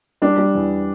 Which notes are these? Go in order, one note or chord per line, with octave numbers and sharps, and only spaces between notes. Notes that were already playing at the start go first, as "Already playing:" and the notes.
G3 D4
G3
E2